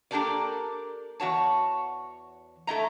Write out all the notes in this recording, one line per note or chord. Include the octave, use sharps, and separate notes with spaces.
A#3 D4 G4 A4 A#4 D5
E2 F#4 C#5 A5
A3 E4 D#5 A#5